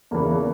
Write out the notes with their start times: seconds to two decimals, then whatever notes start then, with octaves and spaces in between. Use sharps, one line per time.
0.11 E2 C#3 E3 A#3